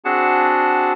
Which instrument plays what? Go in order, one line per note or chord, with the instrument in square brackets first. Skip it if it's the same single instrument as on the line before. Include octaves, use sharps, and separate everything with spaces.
[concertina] C4 D4 F#4 G#4 F#5 A5